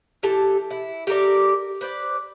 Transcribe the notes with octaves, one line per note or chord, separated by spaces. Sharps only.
E3 G4 A4 A5
E4
G4 A4 A#4 D5
B4 C5 D5